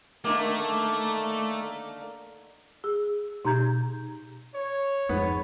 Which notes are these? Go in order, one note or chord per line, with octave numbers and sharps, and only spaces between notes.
D3 D#3 A3 A#3
G#4 E6
B2 D#4 G4 A#5 G6 G#6
C#5
F2 G#2 B3